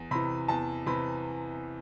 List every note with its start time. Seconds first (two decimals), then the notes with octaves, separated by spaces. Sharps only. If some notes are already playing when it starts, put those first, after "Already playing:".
Already playing: E2
0.11 C3 E3 B5
0.48 E2 A5
0.86 C3 E3 B5